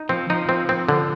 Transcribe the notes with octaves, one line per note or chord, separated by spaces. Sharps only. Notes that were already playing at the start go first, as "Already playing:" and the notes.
Already playing: D#4
F3 C4
F3 D#4
C4
C4
D3